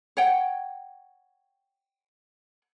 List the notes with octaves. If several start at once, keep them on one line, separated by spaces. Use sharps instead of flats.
C#5 F#5 G5